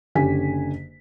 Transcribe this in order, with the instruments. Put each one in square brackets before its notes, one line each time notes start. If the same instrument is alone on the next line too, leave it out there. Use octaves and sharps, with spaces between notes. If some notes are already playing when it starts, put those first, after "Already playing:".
[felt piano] F#1 D3 C#4 G4 G#5 B6